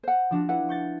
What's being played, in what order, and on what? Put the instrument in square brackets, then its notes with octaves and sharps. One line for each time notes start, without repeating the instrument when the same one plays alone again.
[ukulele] C5 F#5
[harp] F3 D4 F#4
[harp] E4 [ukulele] B4 F#5
[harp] C#6 G6 A6